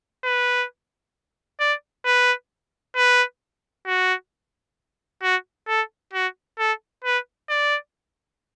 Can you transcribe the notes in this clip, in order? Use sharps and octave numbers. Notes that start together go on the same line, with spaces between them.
B4
D5
B4
B4
F#4
F#4
A4
F#4
A4
B4
D5